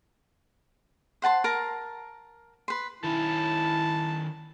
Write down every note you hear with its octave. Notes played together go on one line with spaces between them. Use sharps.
C5 F#5 A5 C6
A#4 A5 A#5
B4 C6
D#3 C#4 E4 A5